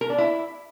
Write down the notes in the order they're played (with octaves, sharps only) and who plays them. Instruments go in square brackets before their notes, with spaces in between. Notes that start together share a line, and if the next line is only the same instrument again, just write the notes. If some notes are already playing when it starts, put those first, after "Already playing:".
[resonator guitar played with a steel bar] A#4
D4
E4